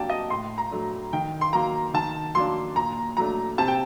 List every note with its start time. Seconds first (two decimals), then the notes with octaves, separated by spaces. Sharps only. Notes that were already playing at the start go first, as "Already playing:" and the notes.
Already playing: C3 F#3 A#3 D4 G5 A5
0.10 D#5
0.30 A2 C6
0.58 A#5
0.71 F#3 A3 D4
1.13 D#3 G5
1.41 C6
1.53 F#3 A#3 A#5
1.94 D#3 A5
2.35 F#3 A#3 D4 C6
2.76 A#2 A#5
3.17 F#3 A3 D4 A#5
3.58 C3 A5
3.68 G5